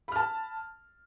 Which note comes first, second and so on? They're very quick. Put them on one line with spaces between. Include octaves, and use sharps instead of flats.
B5 F6 A5